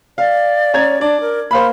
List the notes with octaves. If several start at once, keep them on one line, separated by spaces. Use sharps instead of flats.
D5 F5
C#4 A#5 G#6
D4 D5
A#4
A#3 C5 F5 B5